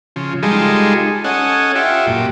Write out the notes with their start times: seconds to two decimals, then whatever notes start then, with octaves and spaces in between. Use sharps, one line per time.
0.16 C#3 F3
0.43 G3 G#3 D#4 F4 G#4 A4
1.24 C#4 A4 D#5 F#5 G#5
1.75 F4 G4 E5 F#5
2.07 F#2 A#2 G4